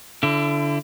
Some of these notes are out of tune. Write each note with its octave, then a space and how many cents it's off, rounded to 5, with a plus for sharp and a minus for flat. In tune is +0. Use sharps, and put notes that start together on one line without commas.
D3 -15 E4 +35